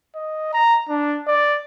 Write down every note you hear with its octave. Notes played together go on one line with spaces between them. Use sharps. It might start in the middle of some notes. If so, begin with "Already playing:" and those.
D#5
A#5
D4
D5